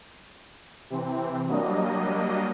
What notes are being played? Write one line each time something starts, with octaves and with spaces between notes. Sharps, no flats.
C3 E3 C4
F#3 G3 A#3 D4 D#5